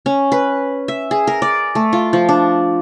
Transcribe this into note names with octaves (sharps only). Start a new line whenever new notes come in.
C#4
B4
E5
G#4
A#4
D5
A3
F4
F3
D4